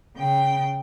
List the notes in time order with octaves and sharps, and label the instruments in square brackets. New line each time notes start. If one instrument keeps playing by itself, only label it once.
[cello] C#3 G5